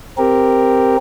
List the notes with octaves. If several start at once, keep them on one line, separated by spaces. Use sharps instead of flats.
C4 G4 A#4